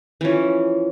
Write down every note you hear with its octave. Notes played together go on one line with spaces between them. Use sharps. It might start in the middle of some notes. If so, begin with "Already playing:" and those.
E3 F3 C#4